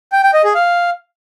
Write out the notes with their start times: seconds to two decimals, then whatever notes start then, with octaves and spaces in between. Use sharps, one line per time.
0.12 G5
0.23 G5
0.34 D#5
0.44 G#4
0.55 F5